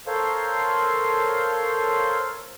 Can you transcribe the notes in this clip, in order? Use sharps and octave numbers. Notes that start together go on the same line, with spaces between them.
A4 A#4 C5 C#5 F5 C6